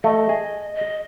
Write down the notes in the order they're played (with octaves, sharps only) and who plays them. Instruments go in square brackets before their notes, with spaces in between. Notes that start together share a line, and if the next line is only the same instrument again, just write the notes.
[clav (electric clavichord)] A3 [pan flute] D#5
[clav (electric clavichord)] G#4
[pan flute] D#5